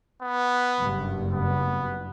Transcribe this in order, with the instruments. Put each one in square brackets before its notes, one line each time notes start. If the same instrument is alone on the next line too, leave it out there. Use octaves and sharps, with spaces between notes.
[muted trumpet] B3
[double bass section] F#1 G2
[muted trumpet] B3